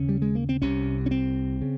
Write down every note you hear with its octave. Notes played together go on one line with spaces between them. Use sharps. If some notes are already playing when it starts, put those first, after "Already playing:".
Already playing: D#2 C#3 C#4
G3
G#3
A#3
C4
C2 C3 C#4
C#4
C4
C#3